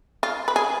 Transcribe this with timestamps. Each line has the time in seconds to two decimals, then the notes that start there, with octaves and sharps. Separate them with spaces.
0.23 F4
0.48 B4
0.56 G#4